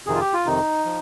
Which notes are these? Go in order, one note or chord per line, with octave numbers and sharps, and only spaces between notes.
F2 C3 D#3 G#4
F4
G4
F4
F2 C3 D#3 D#4
F3